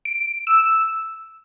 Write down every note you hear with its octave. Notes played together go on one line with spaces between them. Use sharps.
D7
E6